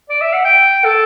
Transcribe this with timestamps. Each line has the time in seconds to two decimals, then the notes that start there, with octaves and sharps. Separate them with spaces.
0.10 D5
0.22 E5
0.33 F#5
0.45 G5
0.84 A4